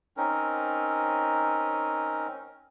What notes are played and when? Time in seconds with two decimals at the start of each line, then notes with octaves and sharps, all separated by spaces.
0.17 C4 C#4 D#4 A#4